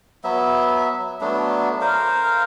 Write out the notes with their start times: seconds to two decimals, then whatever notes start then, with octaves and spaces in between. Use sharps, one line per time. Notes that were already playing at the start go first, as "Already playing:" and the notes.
0.24 F#3 B3 E5
1.21 F#3 A3 B3 D4
1.81 A#4 C5 F5